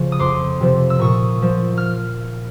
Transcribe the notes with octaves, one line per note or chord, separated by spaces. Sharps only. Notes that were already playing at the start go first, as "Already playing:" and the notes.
Already playing: C#3 F3
D#6
F2 C6 D6
C3 F3
E6
A#2 C#6 D#6
F3
F6